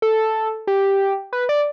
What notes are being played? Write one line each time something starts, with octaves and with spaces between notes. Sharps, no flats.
A4
G4
B4
D5